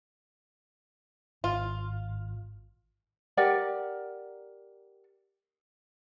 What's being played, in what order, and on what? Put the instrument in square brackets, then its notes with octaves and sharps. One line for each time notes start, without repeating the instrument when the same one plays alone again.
[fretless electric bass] G#1 [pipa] F4
[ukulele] G4 A#4 D5 F#5